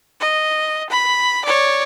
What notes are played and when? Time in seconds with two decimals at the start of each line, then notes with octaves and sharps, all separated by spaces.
0.20 D#5
0.90 B5
1.45 C#5 D5